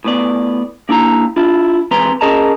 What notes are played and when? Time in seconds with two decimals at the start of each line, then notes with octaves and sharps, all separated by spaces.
0.04 A2 B3 D5
0.89 A#3 D4 E4 G#5 A#5
1.36 D4 E4 F4
1.91 E3 G#3 C4 B4 A#5 C6
2.21 C#4 G#4 A#4 D#5 A5 A#5